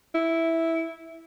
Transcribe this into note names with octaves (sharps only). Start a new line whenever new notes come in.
E4